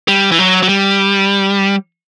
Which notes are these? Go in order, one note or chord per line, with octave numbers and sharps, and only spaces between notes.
G3
E3
F#3
F#3
G3